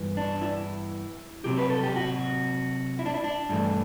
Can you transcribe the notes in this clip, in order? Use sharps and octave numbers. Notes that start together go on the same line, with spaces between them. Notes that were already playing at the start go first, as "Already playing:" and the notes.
Already playing: G2 E3 B3
D4
E4
C3 F#3 C4 G4
B4
A4
G4
F#4
E4
D4
E4
D4
G2 E3 A3